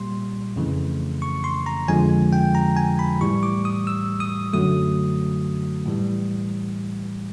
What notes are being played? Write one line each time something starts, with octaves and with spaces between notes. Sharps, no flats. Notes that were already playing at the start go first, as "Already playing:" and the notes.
Already playing: A#2 G3 C6
F2 C#3 E3 A3
C#6
C6
A#5
F2 D3 F3 G#3 G#5
G5
A#5
G#5
B5
A2 E3 G3 C#6
D6
D#6
E6
D#6
F#2 D3 F#3 A3 D#6
A2 E3 G3